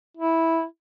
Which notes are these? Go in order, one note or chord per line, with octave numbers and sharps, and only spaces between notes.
E4